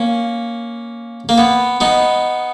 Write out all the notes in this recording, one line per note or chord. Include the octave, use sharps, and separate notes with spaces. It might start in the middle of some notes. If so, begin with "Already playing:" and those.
Already playing: A#3 C#4
A#3
B3
B3 D#4